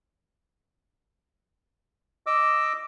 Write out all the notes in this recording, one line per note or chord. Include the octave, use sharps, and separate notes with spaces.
D#5 D6 E6